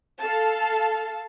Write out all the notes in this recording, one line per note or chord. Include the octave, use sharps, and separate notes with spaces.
A4 F5 A5